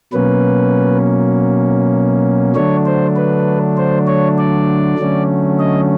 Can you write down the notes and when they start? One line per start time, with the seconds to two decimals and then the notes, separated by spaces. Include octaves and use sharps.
0.13 B2 F#3 A#3 C#4 B4
2.55 D3 F#3 A3 D4 C#5
2.86 C5
3.16 B4
3.77 C5
4.07 C#5
4.38 D5
4.99 D3 F#3 A3 C#4
5.59 D#5